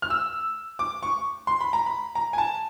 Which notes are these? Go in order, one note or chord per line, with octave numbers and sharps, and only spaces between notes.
F6
E6
D6
C#6
C6
B5
A#5
B5
A#5
G#5
A5